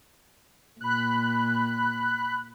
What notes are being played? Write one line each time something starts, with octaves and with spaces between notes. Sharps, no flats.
A#2 B5 F#6